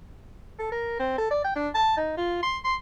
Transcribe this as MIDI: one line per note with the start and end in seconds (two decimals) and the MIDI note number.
0.59 0.70 69
0.72 0.98 70
0.99 1.16 60
1.18 1.30 69
1.31 1.44 74
1.44 1.54 79
1.56 1.68 62
1.75 1.96 81
1.97 2.17 63
2.17 2.39 65
2.43 2.58 84
2.64 2.75 84